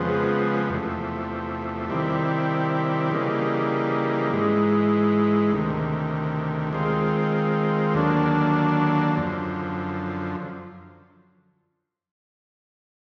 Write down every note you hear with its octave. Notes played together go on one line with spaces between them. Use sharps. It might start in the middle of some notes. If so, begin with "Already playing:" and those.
Already playing: F2 C#3 F3 G#3 B3
E2 C3 F3 A3
C3 D#3 G3 C4 E4
C#3 E3 G3 A#3 D#4
G#2 E3 G#3
D2 C3 D#3
D#3 G#3 C4 F4
D#2 D3 F#3 A#3 D4
F#2 D3 F3